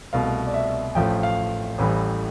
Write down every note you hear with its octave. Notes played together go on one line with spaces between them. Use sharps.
C2 B2 A3 F5
D5
E5
A1 A2 F3 A3 G5
F5
A1 A2 E3 G3